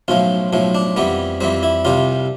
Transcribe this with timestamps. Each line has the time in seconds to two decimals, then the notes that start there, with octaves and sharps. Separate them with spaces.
0.08 B1 A2 F3 F4
0.53 B1 A2 F3
0.75 D4
0.96 F2 E3 G3 B3
1.41 F2 E3 G3 C4
1.63 E4
1.85 C2 C3 G3 F4